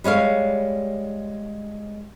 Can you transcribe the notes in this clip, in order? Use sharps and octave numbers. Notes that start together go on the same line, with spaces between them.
G3 G#3 C#5 F5